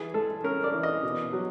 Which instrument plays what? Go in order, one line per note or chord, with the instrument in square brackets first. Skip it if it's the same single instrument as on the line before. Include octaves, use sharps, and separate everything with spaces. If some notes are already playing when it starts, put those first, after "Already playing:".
Already playing: [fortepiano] E3 G#4
G#3 A4
C#4 A#4
D5
E3
D#5
B2
F#3